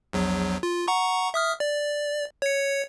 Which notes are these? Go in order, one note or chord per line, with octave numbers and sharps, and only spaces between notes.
A#1 E2 F#3
F4
F#5 A#5 C#6
E5 D#6 F6
D5
C#5 C#7